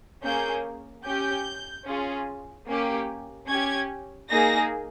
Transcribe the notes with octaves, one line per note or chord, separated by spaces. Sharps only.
A#3 C#4 G#4 G6
C#4 G4 G6
C#4 F4 G#4
A#3 C#4 G4
C#4 G4 G#6
A#3 D#4 G#4 A#6